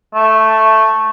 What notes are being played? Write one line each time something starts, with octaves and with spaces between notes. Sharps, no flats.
A3